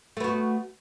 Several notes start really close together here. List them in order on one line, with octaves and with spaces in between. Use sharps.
A3 B3 F#4